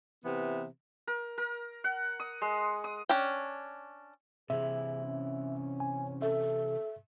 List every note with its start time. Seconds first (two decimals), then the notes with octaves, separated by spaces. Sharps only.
0.24 C3 E3 B3
1.07 A#4
1.38 A#4
1.84 F#5
2.20 D#6
2.41 G#3
2.84 D#6
3.09 C#4 D4 G5
4.50 C3 E3 G#4 E5
5.04 C#4
5.80 G#5
6.22 A4 E5